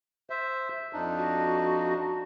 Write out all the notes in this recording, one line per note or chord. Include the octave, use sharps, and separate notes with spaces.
C5 E5
F2 D4 D#4
F#4